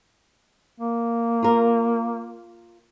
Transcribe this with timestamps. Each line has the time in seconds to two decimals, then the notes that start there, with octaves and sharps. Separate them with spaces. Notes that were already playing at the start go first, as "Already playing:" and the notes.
0.80 A#3
1.43 F4 A#4